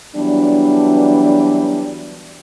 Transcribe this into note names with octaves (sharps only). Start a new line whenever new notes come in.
E3 F#3 G3 B3 D4